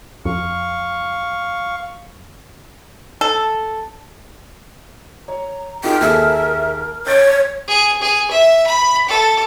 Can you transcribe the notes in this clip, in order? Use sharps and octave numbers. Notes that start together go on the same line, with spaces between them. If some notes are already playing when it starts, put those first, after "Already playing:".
F2 F5 C#6
A4
C#5 A#5
D#4 F4 G#4 A#4 G5
D#2 G#4 A4 E5
C#5 G6 A6 D7
G#4
G#4
E5
B5
A4